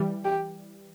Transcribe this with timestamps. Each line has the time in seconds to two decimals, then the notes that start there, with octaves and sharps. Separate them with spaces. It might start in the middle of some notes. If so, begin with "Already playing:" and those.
Already playing: E3 G3
0.25 G4